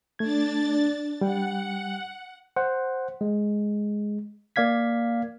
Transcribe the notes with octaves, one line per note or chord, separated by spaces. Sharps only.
A3 D4 G#6 A6
G3 F#5 G5
C5 F#5
G#3
A#3 D5 F5 G#6 B6